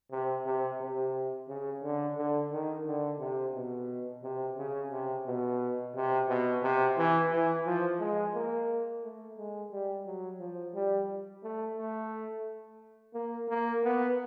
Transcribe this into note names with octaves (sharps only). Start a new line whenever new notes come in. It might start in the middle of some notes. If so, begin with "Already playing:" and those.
C3
C3
C3
C#3
D3
D3
D#3
D3
C3
B2
C3
C#3
C3
B2
C3
B2
C3
E3
E3
F3
G#3
A#3
A3
G#3
G3
F#3
F3
G3
A3
A3
A#3
A#3
B3